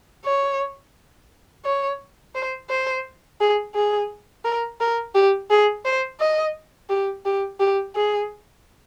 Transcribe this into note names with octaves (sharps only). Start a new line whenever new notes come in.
C#5
C#5
C5
C5
G#4
G#4
A#4
A#4
G4
G#4
C5
D#5
G4
G4
G4
G#4